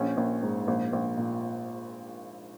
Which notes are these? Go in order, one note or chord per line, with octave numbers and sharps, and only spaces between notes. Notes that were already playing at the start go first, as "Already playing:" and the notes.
Already playing: A#1 C#4
A#1
G#2
A#1
A#1
A#2